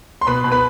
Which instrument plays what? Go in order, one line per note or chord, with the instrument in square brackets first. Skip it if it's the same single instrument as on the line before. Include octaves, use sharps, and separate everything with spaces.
[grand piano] C6
B2 B4 B5
B2
B4 B5